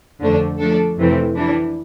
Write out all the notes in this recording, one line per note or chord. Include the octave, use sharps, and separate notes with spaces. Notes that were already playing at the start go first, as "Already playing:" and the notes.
F2 D3 A3 D4
F3 A3 D4 A4
F2 C3 E3 A3 C4
E3 G3 D4